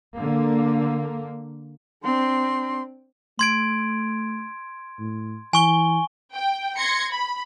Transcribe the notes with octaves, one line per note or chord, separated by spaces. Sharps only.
D3 A#3
C4 D4 C6
A3 C6 G#6 D7
A2
E3 G#5 C#6 G7
G5
C6 G#6 A#6 C#7
B5